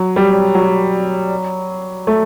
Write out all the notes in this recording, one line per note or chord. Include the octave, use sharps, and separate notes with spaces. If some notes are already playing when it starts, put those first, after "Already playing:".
Already playing: F#3
G3
F#3
A3